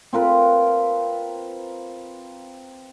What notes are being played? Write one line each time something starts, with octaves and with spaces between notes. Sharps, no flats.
C4 F4 A#4 B4